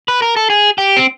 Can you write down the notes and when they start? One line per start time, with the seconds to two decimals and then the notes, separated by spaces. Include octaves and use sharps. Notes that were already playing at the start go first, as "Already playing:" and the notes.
0.08 B4
0.22 A#4
0.37 A4
0.50 G#4
0.78 G4
0.97 C4